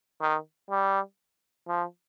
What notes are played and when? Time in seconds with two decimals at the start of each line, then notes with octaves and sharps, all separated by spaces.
0.21 D#3
0.70 G3
1.68 F3